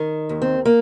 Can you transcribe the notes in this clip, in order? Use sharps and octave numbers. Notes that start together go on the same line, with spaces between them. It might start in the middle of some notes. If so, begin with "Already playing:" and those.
Already playing: D#3
D#2
C4
A#3